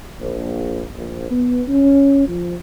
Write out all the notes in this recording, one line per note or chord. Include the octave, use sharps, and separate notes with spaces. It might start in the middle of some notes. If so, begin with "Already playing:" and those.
A#1
A#1
B3
C#4
F3